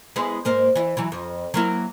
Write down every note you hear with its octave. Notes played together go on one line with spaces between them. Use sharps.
G#3 B3 E4
G#2 A#3 C5
E3 E4
E3 F#3 E4
F2
F#3 A#3 E4